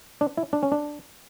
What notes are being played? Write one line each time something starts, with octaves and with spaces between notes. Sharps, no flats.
D4
E4
D4
C#4
D4